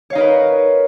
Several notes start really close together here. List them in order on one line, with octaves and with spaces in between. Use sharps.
C#5 F5 D#4 A#4 B4